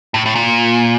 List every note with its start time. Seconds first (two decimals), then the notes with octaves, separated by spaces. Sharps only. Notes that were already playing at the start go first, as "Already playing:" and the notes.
0.14 A2
0.26 A2
0.35 A#2